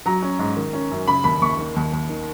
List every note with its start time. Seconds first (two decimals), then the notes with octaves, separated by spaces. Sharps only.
0.06 F#3 A#5
0.22 C#4
0.39 G#2
0.56 D#3
0.73 C#4
0.91 F#2
1.07 C#3 B5
1.24 D#2 B5
1.42 D#2 C#6
1.58 D#3
1.76 D#2
1.93 D#2
2.09 D#3